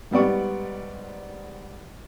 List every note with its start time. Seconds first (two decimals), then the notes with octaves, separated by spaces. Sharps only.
0.11 G#2 G3 B3 D5 C#6